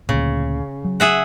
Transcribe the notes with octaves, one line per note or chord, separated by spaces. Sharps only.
D2 A#2 C#3
F#3
G#4 E5 F#5